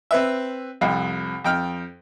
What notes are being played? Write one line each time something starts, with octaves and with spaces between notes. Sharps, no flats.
C4 B4 E5
C2 F2
F2 G5 F6